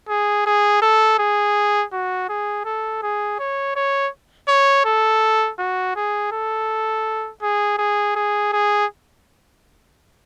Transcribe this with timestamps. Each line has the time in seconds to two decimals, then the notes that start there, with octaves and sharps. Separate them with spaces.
0.09 G#4
0.46 G#4
0.82 A4
1.19 G#4
1.93 F#4
2.29 G#4
2.65 A4
3.03 G#4
3.39 C#5
3.76 C#5
4.48 C#5
4.85 A4
5.59 F#4
5.96 G#4
6.32 A4
7.43 G#4
7.78 G#4
8.16 G#4
8.53 G#4